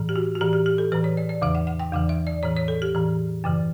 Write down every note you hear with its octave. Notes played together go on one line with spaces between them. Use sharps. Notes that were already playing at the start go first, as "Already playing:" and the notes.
Already playing: A2 E3
G4
F#4
F#4
A2 E3 G4
G4
G4
A4
A2 E3 B4
C#5
D5
D5
E2 C#3 E3 E5
F#5
F#5
G5
E2 C#3 E3 F#5
E5
D5
A2 E3 C#5
C#5
A4
G4
A2 E3
F#2 C#3 E3